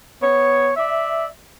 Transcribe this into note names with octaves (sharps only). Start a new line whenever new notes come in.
B3 C#5
D5 E5